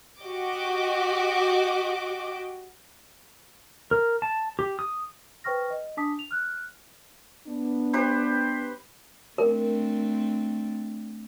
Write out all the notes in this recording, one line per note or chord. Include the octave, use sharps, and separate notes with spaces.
F#4 G4 D#5 D6
A#4
A5
G4
D#6
B4 C5 G5 C#6 F6 A#6
D#5
D4 A5 D6 D#6 B6
F7
F6 F#6
B3 D4
G4 B4 C5
A3 C4 D4 A#4